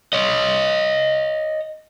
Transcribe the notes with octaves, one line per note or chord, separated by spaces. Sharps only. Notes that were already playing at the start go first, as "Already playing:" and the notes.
C#5 D#5